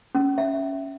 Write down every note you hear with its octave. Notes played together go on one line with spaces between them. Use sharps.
C#4
E5